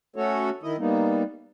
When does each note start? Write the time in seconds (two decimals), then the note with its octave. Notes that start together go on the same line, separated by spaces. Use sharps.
0.16 A3 C#4 F#4 A4 C#5
0.63 D#3 E4 D#5
0.79 G3 A#3 B3 D#4